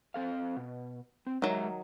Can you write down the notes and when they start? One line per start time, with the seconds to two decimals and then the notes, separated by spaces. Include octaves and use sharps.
0.14 C4 A4 F5
0.56 B2
1.27 C4
1.42 D#3 F#3 G#3 A#4 E5